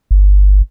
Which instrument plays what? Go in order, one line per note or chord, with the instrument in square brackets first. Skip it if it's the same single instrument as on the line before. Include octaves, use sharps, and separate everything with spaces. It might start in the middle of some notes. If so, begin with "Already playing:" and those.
[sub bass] G1